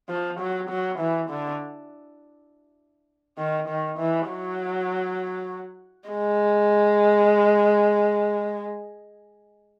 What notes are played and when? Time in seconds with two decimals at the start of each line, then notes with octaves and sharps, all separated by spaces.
0.09 F3
0.40 F#3
0.70 F#3
0.99 E3
1.30 D3
3.38 D#3
3.68 D#3
3.99 E3
4.29 F#3
6.09 G#3